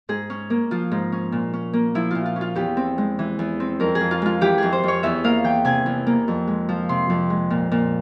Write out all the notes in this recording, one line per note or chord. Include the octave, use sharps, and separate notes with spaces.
G#2 G#4
C#4
A#3
F3 F4
G#2
C#4
A#2
C#4
A#3
F3 E4
A#2 F4
F4
C#4
F4
E2 G4
C4
G#3
E3
E2
C4
F2 A#4
G#4
F2
F4
G#3 F4
E3 G4
F2 G#4
C5
F2 C#5
E2 E5
A#3 F5
E3 G5
C3 G#5
E2
A#3
F2
G#3
F3
C3 C6
F2
G#3
A#2
A#2